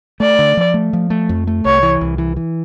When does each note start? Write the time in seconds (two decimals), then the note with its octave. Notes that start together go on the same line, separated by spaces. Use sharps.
0.20 A3 D5
0.39 D3
0.57 F3
0.74 A3
0.93 F3
1.10 A3
1.29 F2
1.47 A3
1.65 C2 C#5
1.83 E3
2.01 C2
2.18 E3
2.36 E3